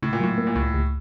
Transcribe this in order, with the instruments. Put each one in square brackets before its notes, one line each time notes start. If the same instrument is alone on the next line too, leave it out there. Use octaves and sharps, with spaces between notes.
[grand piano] A2 [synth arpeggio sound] C#3
[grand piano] A#2
[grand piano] A2 [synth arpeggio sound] F#3
[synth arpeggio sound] A#3
[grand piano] A#2
[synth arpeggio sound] C#2 [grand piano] A2
[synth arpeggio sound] C#2